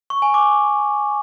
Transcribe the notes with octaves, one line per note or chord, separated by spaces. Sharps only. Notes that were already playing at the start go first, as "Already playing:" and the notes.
C#6
G#5
D6